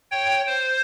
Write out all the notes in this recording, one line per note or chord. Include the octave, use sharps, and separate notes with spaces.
C#5 G5
C5